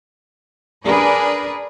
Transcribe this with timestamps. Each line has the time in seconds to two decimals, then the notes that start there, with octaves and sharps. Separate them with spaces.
0.84 D4 G#4 A#4 B4 D5